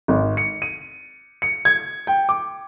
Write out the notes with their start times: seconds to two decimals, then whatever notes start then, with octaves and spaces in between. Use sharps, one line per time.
0.08 G#1
0.37 C#7
0.62 D#7
1.42 C#7
1.65 G#6
2.07 G5
2.29 D6